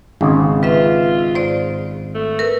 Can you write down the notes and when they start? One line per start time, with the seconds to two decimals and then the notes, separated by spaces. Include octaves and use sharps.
0.21 G#1 C#3
0.63 F4 B4 E5
1.35 G#2 C5 D5
2.15 A3
2.39 A#4 B4 E6